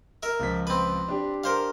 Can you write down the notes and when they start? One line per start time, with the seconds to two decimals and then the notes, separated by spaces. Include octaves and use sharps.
0.23 A#4 E5
0.39 C#2 F3 B6
0.67 C4 B4
1.08 D4 G4
1.44 A#4 C5 F5